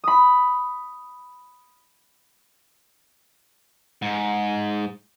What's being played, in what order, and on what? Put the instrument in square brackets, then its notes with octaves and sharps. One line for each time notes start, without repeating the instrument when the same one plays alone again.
[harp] B5 D#6
[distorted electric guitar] G#2